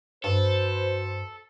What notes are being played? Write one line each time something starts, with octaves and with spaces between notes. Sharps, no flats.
G2 F#4 A4 B4 C5